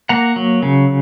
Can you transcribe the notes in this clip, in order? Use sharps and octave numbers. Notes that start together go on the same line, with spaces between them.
A#3 F#5 A#5
F#3
C#3